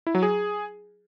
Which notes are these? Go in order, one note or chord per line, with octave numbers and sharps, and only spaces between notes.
E4
F#3
G#4